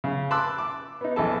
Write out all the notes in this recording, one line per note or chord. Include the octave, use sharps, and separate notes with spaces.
C#3
A5 B5 C6 D6 E6 F#6
D6
B3 D#4
A#1 E2 A4 A5